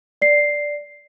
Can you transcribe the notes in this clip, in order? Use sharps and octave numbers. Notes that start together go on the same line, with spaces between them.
D5 C7